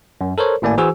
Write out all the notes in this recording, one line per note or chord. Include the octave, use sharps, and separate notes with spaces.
F#2
A4 A#4 C5 C#5
G#1 A2 A#3 D5 G#5
E3 F#4 G#4 C5 G#5 E6